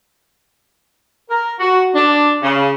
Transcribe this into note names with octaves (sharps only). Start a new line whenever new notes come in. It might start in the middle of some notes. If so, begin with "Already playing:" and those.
A#4
F#4
D4
C#3